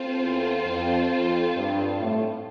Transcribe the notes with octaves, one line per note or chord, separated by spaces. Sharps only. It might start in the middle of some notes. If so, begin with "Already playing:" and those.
Already playing: C4 F4 A4 C5
E2
F2
F2
G2
A2